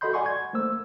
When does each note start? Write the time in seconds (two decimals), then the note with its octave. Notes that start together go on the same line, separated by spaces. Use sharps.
0.01 F#4 A4 D#5 B5 C6 G6
0.13 D5 F#5 G#5 C6 C#6
0.26 G#6
0.53 A3 A#3 C5 E6